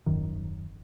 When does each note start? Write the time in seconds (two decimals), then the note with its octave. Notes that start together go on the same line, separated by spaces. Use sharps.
0.06 D#1 G#1 F#2 D#3